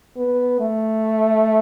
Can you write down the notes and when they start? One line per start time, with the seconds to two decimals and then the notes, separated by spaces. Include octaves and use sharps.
0.17 B3
0.60 A3